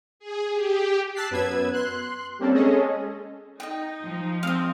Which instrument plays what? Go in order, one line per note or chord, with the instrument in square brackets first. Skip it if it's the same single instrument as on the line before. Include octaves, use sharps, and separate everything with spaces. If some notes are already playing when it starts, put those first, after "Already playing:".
[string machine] G#4
G4
[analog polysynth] A5 E6 F#6 A6 B6 C7
F#2 B3 B4 E6 G#6
C6 F#6
G3 A#3 C4 C#4 A4
G#3 C#4 G#4 A4 D#5
[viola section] D#4 [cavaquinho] D#5 G5
[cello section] F3
[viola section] G#3 C4 [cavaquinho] F5 D#6